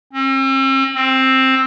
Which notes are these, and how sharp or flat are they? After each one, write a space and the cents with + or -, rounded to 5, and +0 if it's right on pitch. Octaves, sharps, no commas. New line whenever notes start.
C4 +45
C4 +10